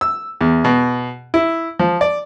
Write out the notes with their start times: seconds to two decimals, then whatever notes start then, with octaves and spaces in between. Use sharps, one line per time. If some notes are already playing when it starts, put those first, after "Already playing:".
0.01 E6
0.41 E2
0.65 B2
1.34 E4
1.79 F3
2.01 D5